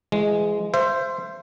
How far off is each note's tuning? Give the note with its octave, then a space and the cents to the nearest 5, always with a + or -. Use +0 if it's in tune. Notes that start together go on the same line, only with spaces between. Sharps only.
E3 +40 G#3 +0
C5 +0 E5 +35